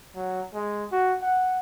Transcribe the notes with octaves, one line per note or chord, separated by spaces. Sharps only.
F#3
G#3
F#4
F#5